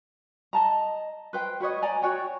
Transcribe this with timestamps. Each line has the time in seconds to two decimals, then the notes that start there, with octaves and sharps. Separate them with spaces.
0.53 D#5 A5 A#5
1.33 B4 C5 G5
1.60 F#4 B4 C#5 D#5
1.82 D5 D#5 G#5 A#5
2.02 F#4 C#5 D5 G5